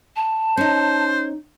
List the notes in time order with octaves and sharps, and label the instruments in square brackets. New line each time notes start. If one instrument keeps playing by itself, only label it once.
[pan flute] A5
[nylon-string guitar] C#4 D#4 [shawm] C5